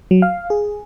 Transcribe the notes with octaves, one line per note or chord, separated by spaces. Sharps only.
F#3
F5
G#4